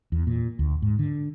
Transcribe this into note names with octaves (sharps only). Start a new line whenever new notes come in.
E2
A#2
D2
G#2
D3